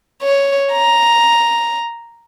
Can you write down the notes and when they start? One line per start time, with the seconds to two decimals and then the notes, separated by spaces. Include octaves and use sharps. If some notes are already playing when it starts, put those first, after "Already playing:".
0.23 C#5
0.72 A#5